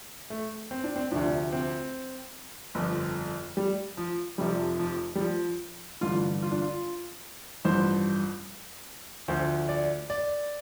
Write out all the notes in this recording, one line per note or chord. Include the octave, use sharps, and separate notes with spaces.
A3
C4
D4
C4
D2 C3 F3 D4
C4
G1 F2 F3
G3
F3
F1 F2 C3 F3 G3
F3
G3
F3
A1 G2 D3 F4
F4
D4
F4
A1 G2 F3 C5
D2 D3 F3 C5
D5
D5